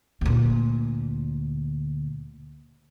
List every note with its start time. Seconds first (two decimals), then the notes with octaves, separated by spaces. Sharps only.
0.21 D2 A#2